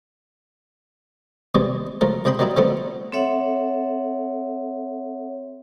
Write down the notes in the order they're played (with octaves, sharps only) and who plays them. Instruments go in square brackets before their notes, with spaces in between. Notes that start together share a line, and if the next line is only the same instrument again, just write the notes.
[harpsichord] D#2 C3 E3 G3 G#3
C#2 F3 A3 A#4
C#2 C3 D#5 G5 B5 C6
D#3 F#3 G3 D#4 E4
D3 F3 G3 A3 B3 C4
[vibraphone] C4 A4 C#5 E5 F#5